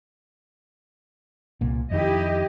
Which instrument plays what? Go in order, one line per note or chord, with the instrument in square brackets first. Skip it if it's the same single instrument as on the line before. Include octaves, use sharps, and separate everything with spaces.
[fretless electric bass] C2 A#2
[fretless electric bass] F2 D#3 [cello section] E4 G4 D#5